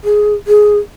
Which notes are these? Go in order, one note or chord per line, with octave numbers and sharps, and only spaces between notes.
G#4
G#4